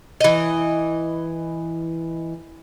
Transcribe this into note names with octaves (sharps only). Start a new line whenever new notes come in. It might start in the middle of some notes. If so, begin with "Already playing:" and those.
E3 D#5